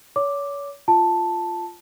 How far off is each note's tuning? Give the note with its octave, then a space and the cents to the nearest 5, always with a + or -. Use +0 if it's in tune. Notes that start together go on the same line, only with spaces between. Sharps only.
C#5 +35 D6 +0
F4 +0 A5 +0